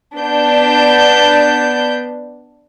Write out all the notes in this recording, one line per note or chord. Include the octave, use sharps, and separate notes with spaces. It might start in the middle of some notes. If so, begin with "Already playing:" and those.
B3 D4 G6